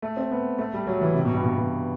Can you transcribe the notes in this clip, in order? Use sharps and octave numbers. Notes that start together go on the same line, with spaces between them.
A3
C4
B3
A3
G3
F#3
E3
C3
B2
G2
B2
B2